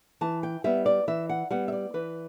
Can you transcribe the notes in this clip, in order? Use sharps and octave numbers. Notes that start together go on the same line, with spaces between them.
E3 A5
G5
G3 B3 E5
D5
E3 E5
F#5
G3 B3 F#5
E5
D5
E3 B4